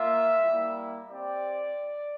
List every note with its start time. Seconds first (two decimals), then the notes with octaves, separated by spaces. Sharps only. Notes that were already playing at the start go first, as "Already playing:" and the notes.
Already playing: A#3 F4 E5
0.42 G3 A#3 E4
1.09 C4 G4 D5